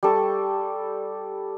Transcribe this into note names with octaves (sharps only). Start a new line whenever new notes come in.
G3 A4 C#6